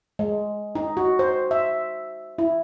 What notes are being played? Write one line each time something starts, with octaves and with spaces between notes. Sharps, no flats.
G#3
D#4
F#4
C5
E5
E4